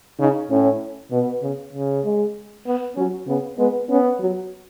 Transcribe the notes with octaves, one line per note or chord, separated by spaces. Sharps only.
C#3 D#4
A2 C#4
B2 B3
C#3
C#3
G#3
B3
F#3 C#4
C#3 B3
G#3 B3
B3 C#4
F#3